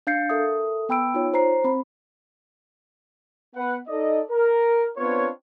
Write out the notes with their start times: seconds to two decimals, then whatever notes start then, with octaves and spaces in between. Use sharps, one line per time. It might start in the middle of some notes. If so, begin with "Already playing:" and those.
0.07 D4 F5 G6 A6 C7 C#7
0.30 A4 A#4 E5 D#6
0.89 B3 G5 B5 E6 D7
1.14 D#4 F4 C#5
1.34 C5 A#5 C7
1.64 C4 B5
3.56 B3 B4 F#5
3.88 D#4 A4 D5 D#5
4.31 A#4
4.97 B3 C4 D4 F4 B4 C#5